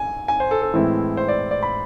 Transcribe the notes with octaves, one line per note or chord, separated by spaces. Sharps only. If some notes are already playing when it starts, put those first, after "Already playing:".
Already playing: G#5
G#5
C5
A4
A4
A2 E3 G#3 C4 E4
C5
D5
D5
B5